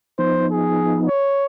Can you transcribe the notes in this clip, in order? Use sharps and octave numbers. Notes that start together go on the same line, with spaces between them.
F3 B3 D#4 C5
G#4
C#5